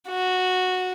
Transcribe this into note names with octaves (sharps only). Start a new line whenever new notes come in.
F#4